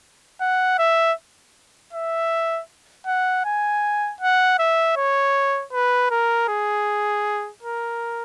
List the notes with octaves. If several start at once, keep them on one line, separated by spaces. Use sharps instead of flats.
F#5
E5
E5
F#5
G#5
F#5
E5
C#5
B4
A#4
G#4
A#4